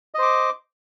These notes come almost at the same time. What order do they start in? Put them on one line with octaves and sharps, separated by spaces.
D#5 C5 D6